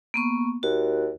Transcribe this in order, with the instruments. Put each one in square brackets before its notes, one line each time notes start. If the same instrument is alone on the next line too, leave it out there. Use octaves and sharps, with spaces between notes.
[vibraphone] A#3 B3 C#6
[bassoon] D#2 [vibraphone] F#4